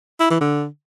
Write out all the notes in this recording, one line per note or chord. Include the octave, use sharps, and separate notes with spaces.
E4
E3
D3